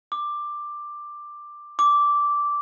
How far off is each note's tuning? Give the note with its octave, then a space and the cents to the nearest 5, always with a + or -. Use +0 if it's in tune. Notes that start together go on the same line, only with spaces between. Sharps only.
D6 +10
D6 -10